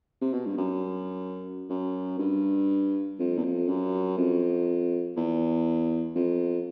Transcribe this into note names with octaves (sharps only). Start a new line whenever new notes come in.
C3
B2
G2
F#2
F#2
G2
F2
E2
F2
F#2
F2
E2
F2